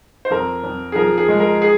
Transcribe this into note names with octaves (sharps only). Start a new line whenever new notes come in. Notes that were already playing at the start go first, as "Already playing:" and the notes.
C5
F2 A#4
F2
G#4
F3 A#4
G#4
G#3
A#4
G#4